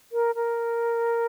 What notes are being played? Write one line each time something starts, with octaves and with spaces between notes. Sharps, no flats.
A#4
A#4